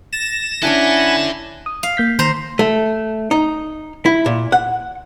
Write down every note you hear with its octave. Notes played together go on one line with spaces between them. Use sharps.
A6 A#6 E7
C#4 D4 E4 A4 D5 F#5 G#5 B5
D#6
F5
A#3 G6 B6
D#3 C5 A#5
A3
D#4
E4
A#2
F#5